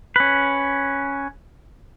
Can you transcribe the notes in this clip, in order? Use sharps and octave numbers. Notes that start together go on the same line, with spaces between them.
C#4 B4